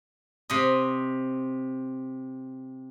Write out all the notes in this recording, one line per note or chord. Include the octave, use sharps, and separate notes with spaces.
C3 D#5